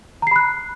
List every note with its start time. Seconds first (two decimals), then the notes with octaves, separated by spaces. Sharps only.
0.22 A#5
0.27 C7
0.31 B5
0.36 F#6